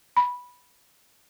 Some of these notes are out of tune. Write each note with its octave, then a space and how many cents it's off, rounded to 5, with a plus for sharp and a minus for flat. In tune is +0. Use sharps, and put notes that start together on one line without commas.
B5 -10